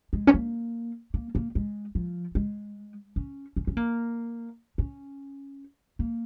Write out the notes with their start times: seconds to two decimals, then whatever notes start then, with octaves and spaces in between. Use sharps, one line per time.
0.13 G#3
0.27 C#4
0.34 A#3
1.14 A#3
1.35 A#3
1.55 G#3
1.95 F3
2.35 G#3
3.16 C#4
3.56 C#4
3.67 C#4
3.77 A#3
4.78 C#4
5.99 A#3